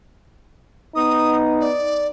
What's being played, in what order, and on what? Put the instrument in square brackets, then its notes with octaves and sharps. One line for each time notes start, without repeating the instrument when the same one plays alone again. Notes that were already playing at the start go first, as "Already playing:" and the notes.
[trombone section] B3 D#4 [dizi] D#6
[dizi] D5